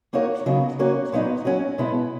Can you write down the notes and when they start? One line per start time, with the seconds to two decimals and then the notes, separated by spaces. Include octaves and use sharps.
0.13 A#3 D#4 F#4 A#4 C#5
0.46 C#3 F#3 B3 D#4 F#4
0.79 A#3 C#4 F#4 C#5
1.12 A#2 F#3 B3 D#4
1.45 F#3 C#4 F#4
1.78 B2 G#3 B3 E4